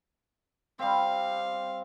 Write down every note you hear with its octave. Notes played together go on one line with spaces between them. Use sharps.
G3 C4 F5